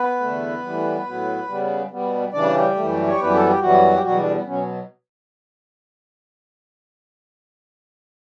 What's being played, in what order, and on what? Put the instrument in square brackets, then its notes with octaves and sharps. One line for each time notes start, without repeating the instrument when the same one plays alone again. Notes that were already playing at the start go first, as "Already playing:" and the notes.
Already playing: [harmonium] B3 B4
E2 D3 A3
A2 E3 G3
A2 F#3 B3
C#3 G3 B3
B2 G3 B3
C#3 E3 G3 D4 D5
G3 G4
F#2 E3 A3
C#5
F#2 E3 G3 B3 B4
A4
G4
F#2 E3 F#3 G3 B3 F#4
G4
E2 B2 F#3 G3 F#4
D3 D4
B3
B2 F#3 B3 C#4